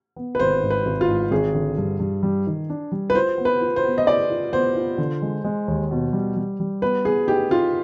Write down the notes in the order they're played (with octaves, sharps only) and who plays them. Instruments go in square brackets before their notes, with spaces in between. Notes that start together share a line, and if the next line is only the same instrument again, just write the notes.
[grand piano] B3
[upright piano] B4
[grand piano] G#1 [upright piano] C5
[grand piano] G#2
[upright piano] B4
[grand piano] G#1
[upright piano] F4
[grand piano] G#2
[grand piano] G#1 [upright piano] G#4
[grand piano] D3
G2
G2
G3
D#3
D4
G3
[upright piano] B4
[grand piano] F4 [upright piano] C5
[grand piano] B3
[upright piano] B4
[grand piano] F4
[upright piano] C5
[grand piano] B3
[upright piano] D#5
[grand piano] G#4 [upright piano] D5
[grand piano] F4
[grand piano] B3 [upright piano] C5
[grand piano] F4
D3
G#3
G#3
D#2
B2
G3
G3
G3
[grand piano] B3 [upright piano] B4
[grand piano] B3 [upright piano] G#4
[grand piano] D#4 [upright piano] G4
[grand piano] D#4 [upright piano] F4